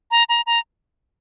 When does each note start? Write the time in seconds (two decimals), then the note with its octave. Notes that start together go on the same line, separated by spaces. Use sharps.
0.11 A#5
0.29 A#5
0.46 A#5